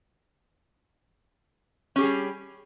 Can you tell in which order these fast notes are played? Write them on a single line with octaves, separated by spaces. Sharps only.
C#4 G4 G#4 G3